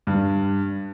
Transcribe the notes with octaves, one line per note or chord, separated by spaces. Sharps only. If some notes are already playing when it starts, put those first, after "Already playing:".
G2